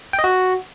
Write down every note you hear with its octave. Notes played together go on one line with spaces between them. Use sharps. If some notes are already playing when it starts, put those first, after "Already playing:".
G5
D#5
F#4